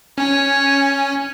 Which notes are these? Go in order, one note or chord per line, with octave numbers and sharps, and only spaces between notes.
C#4 C#5 G#5